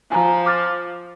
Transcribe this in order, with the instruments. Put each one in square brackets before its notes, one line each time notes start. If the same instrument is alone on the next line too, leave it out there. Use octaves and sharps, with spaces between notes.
[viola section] F3 [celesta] G#5 A#5
[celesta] D6 F6 A6